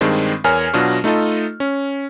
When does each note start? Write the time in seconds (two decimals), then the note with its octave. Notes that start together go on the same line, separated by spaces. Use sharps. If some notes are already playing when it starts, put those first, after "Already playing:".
0.01 G2 D#3 G#3 C4 D4
0.44 E2 A#4 C#5 G#5 F6
0.73 B2 F#3 D4 F4 F#4
1.04 A3 D#4 F4 A4 D#5
1.60 C#4